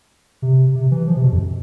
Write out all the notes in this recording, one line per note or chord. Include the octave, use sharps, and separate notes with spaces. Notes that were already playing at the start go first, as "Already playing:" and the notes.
C3
C3
E3
F3
C3
B2
F2